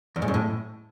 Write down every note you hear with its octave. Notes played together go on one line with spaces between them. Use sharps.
E2
G#2
F#2
A2